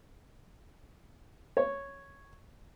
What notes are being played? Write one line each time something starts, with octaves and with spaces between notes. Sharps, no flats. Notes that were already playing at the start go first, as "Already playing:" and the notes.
C#5